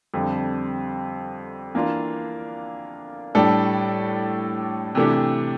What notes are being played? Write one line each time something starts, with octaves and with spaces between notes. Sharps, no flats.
F2 D3 G3 C4
E3 A#3 D4 F4
A2 G3 D4 A4
C3 E3 A3 D4 G4